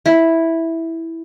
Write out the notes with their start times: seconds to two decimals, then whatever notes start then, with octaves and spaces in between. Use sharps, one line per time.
0.06 E4